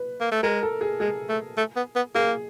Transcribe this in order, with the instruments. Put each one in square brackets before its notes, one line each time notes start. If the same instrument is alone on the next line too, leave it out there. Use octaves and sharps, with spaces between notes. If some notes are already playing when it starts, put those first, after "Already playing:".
Already playing: [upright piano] B4
[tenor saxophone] A#3
A3
[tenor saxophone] G#3 [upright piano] A#4
[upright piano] A4
G#4
[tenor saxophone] G#3 [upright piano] G#4
[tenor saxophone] A3
A3
B3
B3
[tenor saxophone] A#3 [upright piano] G#4